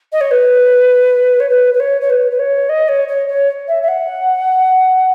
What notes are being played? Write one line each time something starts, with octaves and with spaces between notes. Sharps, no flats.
D#5
C#5
B4
C#5
B4
B4
C#5
C#5
B4
B4
C#5
D#5
C#5
C#5
C#5
E5
E5
F#5